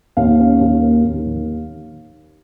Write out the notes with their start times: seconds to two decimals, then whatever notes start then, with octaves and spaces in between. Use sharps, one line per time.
0.17 D#2 F5
0.39 C#4
0.61 D#2
0.82 A#3
1.04 D#2
1.26 D#3